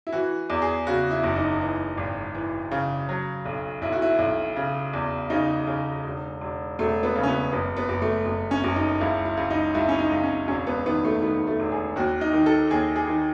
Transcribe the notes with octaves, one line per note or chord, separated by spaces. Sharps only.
E4
E3 F#4
E2
G#4
C#3 F#4
E4
F#1
D#4
E3
G#1
E3
C#3
F#3
B1
B1 E4
F#4
E4
B1
C#3
E2
C#3 D#4
C#3
E1
E1
E1 A3
B3
C#3
C#4
B3
F#1 B3
B3
F#1
A3
F#1
C#4
F#1
D#4
C#2 E4
E4
C#2
D#4
C#2 E4
C#4
D#4
C#2
C#4
E1 C#4
B3
D#3 B3
A3
D#3 B3
A3
E1
G#4
D#2 F#4
D#4
D#3
A4
D#2 G#4
G#4
D#3